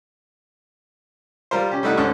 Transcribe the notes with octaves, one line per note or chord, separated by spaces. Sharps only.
G3 F4 A#4 C5
C#4 G4
G3 A3 D#4 E4 F#5
D2 G#2 D3 C#4 C#6